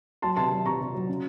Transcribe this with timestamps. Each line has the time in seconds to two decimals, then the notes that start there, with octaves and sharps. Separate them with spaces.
0.22 F#3 A5 C6
0.37 C3 A5 C6
0.52 F#3
0.66 C3 A#5 C#6
0.81 C3
0.95 F#3
1.09 C#3